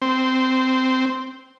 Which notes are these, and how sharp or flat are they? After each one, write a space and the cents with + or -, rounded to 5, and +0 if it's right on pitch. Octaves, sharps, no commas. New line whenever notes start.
C4 -10